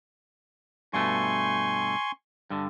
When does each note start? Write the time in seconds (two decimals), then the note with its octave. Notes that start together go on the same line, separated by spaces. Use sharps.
0.93 G2 B2 A3 G#5 C6 C#6
2.50 G2 D3